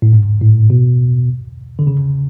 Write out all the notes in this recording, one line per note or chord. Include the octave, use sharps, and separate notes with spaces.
A2
G#2
A2
B2
D3
C#3